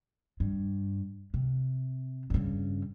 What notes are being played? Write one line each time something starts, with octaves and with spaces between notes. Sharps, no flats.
G2
C3
G2 C#3